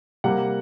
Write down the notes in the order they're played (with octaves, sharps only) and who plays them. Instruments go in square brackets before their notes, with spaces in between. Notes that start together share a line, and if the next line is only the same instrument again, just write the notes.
[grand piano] C3 G3 A#3 F#5